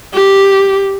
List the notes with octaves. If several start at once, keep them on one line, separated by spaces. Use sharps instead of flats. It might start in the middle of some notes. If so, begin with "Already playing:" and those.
G4